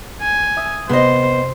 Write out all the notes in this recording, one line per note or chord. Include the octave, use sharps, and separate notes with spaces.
G#5
E5 D#6
C3 B3 C5 D#5